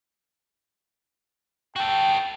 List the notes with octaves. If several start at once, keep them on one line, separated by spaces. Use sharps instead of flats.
F#4 A4 G5